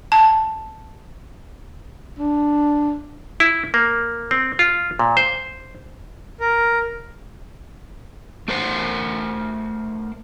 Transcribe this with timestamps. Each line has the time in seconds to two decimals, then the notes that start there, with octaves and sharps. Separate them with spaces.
0.12 A5
2.19 D4
3.40 E4
3.74 A#3
4.31 C4
4.59 F4
4.99 A#2
5.17 C5
6.40 A#4
8.48 A3 A#4 C5 F#5